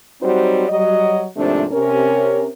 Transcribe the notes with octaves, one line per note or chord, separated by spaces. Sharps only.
F#3 G3 C4 D#4 F#4 C5
F#3 G3 D#5
D#2 G#2 C3 F3 A3 D4
C3 C#4 A#4